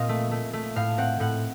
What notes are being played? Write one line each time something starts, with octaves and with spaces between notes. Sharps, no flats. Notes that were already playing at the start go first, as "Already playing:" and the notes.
Already playing: A#2 C4 D#5 F5
A3
A3
A3
A2 F5
C4 F#5
A2 F#5